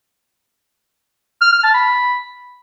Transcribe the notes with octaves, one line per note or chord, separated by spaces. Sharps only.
F6
F6
A5
B5